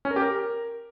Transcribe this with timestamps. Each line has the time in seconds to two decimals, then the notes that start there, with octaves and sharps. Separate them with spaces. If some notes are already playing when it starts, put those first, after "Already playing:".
0.05 C#4
0.11 A#4
0.16 G4
0.22 A#4